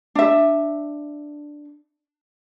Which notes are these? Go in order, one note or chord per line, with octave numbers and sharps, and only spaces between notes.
D4 E5